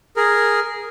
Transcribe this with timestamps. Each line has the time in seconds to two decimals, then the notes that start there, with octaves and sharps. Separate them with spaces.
0.17 G#4 A#4